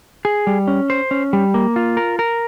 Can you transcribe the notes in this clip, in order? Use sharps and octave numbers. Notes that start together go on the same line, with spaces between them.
G#4
G3
C#4
C5
C#4
G3
A#3
F4
A#4
A#4